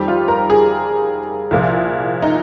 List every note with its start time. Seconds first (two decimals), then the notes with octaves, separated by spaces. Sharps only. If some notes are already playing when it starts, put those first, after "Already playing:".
Already playing: F2 D#3 G3 G4
0.08 F4
0.28 A#4
0.50 G#4
1.51 C2 A#2 F3
2.22 D#4